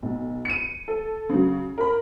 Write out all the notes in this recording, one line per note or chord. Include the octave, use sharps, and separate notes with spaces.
B1
C#7 D#7
A4
C#3 F#3
A#4 B5